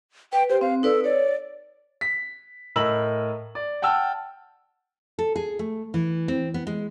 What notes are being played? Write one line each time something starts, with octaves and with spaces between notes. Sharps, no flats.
B4 G5
G4 C5
C4 F5
D#4 A4 B4 D5
C#5 D5
B6
A2 A#4 D#5 B5 E6 F#7
D5
F#5 G5 A5 E6 F6
A4
G#4
A3
E3
C4
B3
G#3